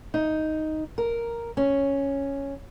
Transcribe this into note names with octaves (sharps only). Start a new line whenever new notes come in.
D#4
A#4
C#4